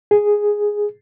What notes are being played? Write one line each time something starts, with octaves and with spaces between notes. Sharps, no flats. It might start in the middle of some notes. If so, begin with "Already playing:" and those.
G#4